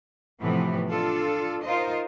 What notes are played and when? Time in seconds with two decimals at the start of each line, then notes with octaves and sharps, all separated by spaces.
0.41 A2 C3 E3 F3 B3
0.90 D4 F4 A4
1.64 D#4 F4 A#4 C5 D#5